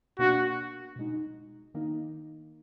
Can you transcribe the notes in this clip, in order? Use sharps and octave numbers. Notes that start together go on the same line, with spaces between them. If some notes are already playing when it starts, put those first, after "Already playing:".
B2 A#3 D4 F#4
B2 G#3 D#4
D#3 A#3 D#4